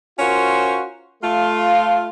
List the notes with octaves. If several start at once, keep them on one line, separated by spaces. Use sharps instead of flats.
C#4 F4 F#4 A#4 C5
A3 F4